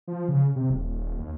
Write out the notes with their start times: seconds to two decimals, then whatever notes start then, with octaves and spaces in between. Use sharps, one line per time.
0.08 F3
0.28 C#3
0.56 C3
0.70 D#1
1.19 D#2